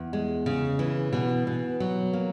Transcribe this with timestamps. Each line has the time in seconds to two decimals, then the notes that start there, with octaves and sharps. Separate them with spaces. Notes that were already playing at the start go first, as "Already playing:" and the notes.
Already playing: E2
0.13 G#3
0.46 C#3
0.79 E3
1.13 B2
1.47 B2
1.80 F#3
2.13 A#3